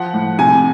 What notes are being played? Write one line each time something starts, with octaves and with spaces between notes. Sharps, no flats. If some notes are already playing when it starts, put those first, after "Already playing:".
Already playing: F3 F#5
A2
C3 G#5